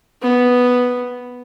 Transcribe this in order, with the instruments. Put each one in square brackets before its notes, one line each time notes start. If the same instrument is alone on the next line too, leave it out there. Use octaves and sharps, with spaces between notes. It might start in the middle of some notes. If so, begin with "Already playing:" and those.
[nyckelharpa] B3